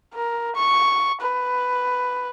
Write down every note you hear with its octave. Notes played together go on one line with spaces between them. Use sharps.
A#4
C#6
B4